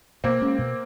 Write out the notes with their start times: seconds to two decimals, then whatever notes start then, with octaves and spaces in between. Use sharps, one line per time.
0.24 B2 A#3 C4
0.41 G#3 C#4
0.59 B2